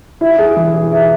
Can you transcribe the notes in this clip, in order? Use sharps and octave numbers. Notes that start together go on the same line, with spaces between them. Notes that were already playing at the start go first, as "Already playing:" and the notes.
E4
G#4
E3
G#4
E4